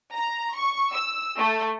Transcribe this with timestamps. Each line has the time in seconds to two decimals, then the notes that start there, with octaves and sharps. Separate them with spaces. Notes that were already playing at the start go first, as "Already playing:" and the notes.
0.13 A#5
0.56 C#6
0.92 E6
1.38 A3